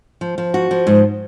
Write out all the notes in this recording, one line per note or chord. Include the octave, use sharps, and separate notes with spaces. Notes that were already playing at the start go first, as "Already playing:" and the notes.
F3
F3
F#4
F3
G#2